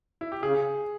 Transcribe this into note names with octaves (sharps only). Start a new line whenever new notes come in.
E4
G4
C#3 G#4